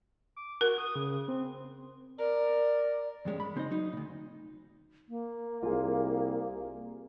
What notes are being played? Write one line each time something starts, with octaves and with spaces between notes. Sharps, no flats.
D6
F#4 A#4
D#6
C#3
C4
A#4 D5
E2 G2 G#3 C#4
B5
C#3 C4 D#4 D#5
F#3 D#4
D2 A#2
A#3
C2 F4 G#4